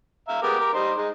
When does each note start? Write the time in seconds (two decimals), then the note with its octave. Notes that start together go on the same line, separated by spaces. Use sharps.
0.28 E5 F5 A#5
0.43 G#3 B3 G4 A#4
0.60 A#4
0.74 G3 D#4 C5
0.96 G#3 D#4